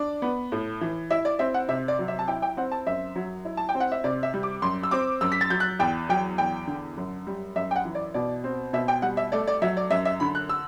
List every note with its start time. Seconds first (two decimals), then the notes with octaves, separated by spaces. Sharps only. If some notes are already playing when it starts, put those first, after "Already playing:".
Already playing: D4 D5
0.22 B3
0.52 A2
0.81 E3
1.11 E4 E5
1.25 D5
1.39 C4 E5
1.54 F#5
1.69 C3 E5
1.88 D5
1.99 F#3
2.08 E5
2.19 A5
2.28 E4 G5
2.42 G5
2.57 C4 F#5
2.72 A5
2.87 F#2 E5
3.16 F#3
3.45 E4
3.57 A5
3.69 G5
3.75 C4
3.80 F#5
3.92 E5
4.04 C3 D5
4.23 E5
4.34 G3
4.43 D6
4.62 F#2 C6
4.83 E6
4.91 C4 D6
5.21 F#2 E6
5.32 B6
5.41 A6
5.50 F#3 G6
5.60 F#6
5.79 E2 G5
6.09 F#3 G5
6.38 E2 G5
6.67 D3
6.97 F#2
7.27 G3
7.56 F#2 E5
7.71 G5
7.76 F#5
7.85 E3
7.95 D5
8.14 B2 D5
8.44 C4
8.73 B2 E5
8.88 G5
9.02 G3 F#5
9.17 E5
9.32 A3 D5
9.47 D5
9.62 F#3 E5
9.77 D5
9.91 F#2 E5
10.05 E5
10.20 D3 B5
10.35 F#6
10.49 E6